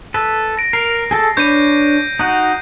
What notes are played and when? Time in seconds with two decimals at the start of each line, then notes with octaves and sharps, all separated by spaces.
0.14 A4 B4
0.57 A#6 D7
0.73 A#4 C7
1.11 G#4 A4 A5
1.37 D4 B4 C#5 G6 D#7
2.19 D#4 F#4 F#5